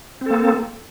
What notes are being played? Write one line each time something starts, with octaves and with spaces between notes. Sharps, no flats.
A#3 C4 A4